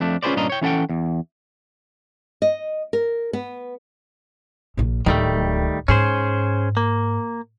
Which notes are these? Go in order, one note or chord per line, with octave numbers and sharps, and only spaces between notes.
F2 A3 D4
C#4 F4 G#4 B4 C5 D5
G2 A#2 C#4 D4 D#5 A#5
C#5 G5
E3 C#4 A4 F#5 G5
E2
D#5
A#4
B3
A#1 A#2
D1 D#3 G3 A3
G#2 C#4 G#4 C5
A#3